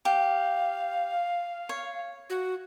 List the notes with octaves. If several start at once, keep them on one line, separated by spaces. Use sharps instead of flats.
G4 F5
C#5
F#4